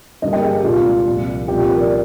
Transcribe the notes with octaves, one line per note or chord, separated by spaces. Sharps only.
G2 D3 G3 A#3 D#5
G5
G#4
G4
C2 A#2 G#3 D4 F4
C2 A#2 F3
C2 A#2 F3 G4
A#4
D5